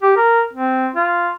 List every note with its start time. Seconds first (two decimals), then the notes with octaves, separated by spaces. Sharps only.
0.02 G4
0.17 A#4
0.53 C4
0.96 F4